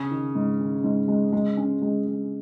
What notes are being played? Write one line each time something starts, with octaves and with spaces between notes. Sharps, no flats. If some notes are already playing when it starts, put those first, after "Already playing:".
Already playing: C#3 C#4
D#3
G#2
D#3
G#2
G#3
G#3
C#4
G#3
G#3